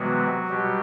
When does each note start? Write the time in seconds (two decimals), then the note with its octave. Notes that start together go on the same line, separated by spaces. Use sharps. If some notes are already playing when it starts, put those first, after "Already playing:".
Already playing: C3 E3 F#3 G#3 B3 F#4
0.49 B2 F#3 G3 G4